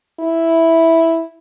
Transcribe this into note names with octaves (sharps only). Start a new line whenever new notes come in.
E4